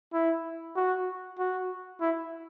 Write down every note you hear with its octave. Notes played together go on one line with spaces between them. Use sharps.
E4
F#4
F#4
E4